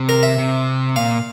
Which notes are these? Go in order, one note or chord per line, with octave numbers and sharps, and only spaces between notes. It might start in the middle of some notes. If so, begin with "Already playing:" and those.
Already playing: C3
A#4
E5
C3
A#2 F5